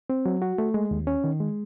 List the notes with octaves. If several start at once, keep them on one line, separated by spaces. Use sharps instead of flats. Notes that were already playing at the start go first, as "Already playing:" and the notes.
C4
F#3
F#4
A3
G#3
D#2
C#4
D#3
G#3